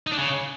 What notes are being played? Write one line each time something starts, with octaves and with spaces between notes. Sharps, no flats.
D#4
D4
C#3